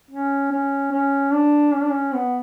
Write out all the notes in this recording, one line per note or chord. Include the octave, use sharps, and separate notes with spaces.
C#4
C#4
C#4
D4
C#4
D4
C#4
B3